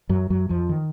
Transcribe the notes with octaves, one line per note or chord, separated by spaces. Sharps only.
F#2 F#3
F#2 F#3
F2 F3
D#3